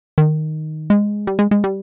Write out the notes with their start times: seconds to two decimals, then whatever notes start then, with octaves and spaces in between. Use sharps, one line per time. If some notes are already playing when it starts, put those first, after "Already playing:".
0.18 D#3
0.90 G#3
1.27 G3
1.39 G#3
1.51 G#3
1.64 G3